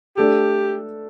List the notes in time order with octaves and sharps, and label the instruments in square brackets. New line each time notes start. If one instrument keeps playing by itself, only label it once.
[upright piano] A3 D4 A4 [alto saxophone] G4